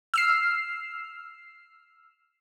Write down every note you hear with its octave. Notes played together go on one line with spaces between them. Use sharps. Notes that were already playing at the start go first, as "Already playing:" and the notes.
E6 F6 C7